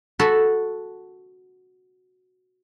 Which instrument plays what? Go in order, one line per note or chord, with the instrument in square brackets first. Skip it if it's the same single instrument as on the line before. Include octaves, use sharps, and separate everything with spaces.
[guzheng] F#4 A4 B5